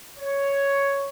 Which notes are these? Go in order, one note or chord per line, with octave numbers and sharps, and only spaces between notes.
C#5